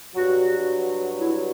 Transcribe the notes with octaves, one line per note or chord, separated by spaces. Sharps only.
G2 F#3 F#4
E4